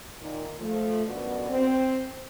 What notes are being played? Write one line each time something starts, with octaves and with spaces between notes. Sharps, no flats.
A#2 D#3
F3 A3
F#2 B2 D3 B3 F#4 D5
C4